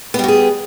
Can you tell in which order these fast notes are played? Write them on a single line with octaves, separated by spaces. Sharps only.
B3 G3 F#4 G#4